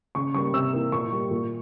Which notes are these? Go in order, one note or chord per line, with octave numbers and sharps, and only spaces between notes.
C#3 C#6
G3 A#3 C#6
C3 E6
E3 A#3
A#2 C#6
G3 A#3
A#2